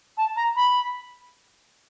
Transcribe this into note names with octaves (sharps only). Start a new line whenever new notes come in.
A5
A#5
B5